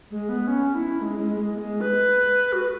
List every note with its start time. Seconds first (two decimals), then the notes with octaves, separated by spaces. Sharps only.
0.11 G#3
0.29 B3
0.47 C#4
0.75 E4
1.01 G#3
1.19 G#3
1.36 G#3
1.55 B3
1.58 G#3
1.81 B4
2.53 F#4
2.61 B4